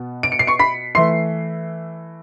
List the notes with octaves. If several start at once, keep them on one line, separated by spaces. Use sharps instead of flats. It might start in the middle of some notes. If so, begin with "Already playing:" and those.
Already playing: B2 B3
D7
C#7
C7
C#6 C#7
B5 B6
E3 A3 C6 C7